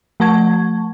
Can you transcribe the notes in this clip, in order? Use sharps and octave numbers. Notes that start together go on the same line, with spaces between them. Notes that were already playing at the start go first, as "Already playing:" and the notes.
F3 A3 F#5 A5 C#6 G#6